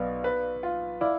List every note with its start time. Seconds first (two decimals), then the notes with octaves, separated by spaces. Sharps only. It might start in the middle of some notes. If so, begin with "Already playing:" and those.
Already playing: B1 B3 D5 F5
0.24 B4
0.63 F4
1.01 E4 D5 F5